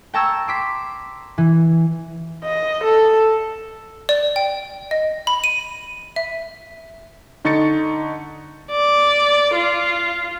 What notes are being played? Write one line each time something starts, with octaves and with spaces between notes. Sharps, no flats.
G5 A5 A#5 C#6 E6 G#6
C6 D6 B6
E3
D#5
A4
D5
G5
D#5
B5
D#7
E5
D3 D#4 C#6 A6 C#7
D5
F4